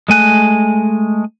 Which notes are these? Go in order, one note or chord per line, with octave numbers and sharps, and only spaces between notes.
G#3 A3 G#5 F#6